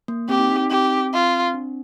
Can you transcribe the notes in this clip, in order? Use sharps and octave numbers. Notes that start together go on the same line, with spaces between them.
A#3
C4 G4
D#4
D#4
D#4
C4 G4
F4
C4
D4